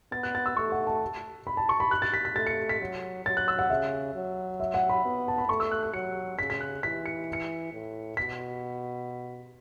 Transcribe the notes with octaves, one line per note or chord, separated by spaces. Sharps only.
B3 A6
F#6
A6
E6
A3 C#6
F#5
A5
B5
A5
C#6
B5
F#6
A6
B6
B6
A3 A6
C#7
B6
F#3
F#3 A6
F#6
E6
F#5
C#3 E5
F#3
E5
F#5
B5
B3
A5
B5
A3 C#6
E6
F#6
F#6
F#3 C#7
C#3 B6
B6
F#6
E3 B6
C#7
C#7
A2
B2 B6